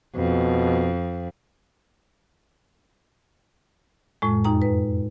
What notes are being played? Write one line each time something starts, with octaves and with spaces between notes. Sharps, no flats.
F2 B2
F2 A2 G#3
F#2 D#4 G5 A#5
B4